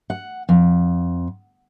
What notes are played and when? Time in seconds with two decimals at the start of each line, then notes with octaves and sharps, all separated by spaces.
0.10 F#5
0.49 F2